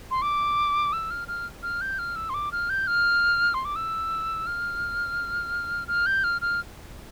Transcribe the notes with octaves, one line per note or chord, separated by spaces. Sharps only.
C6
D6
E6
F6
F6
F6
G6
F6
E6
C6
D6
F6
G6
F6
C6
D6
E6
F6
F6
G6
F6
F6